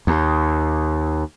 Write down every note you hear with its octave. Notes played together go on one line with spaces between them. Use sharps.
D#2